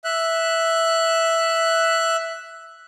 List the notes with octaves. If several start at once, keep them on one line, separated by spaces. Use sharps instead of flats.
E5 F#6